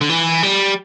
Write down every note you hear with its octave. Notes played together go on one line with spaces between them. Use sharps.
D3
E3
G3